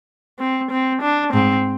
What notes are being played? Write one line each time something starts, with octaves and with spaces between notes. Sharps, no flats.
C4
C4
D4
G#2 C4